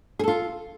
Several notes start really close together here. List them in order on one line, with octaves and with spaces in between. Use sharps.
G#4 A4 F4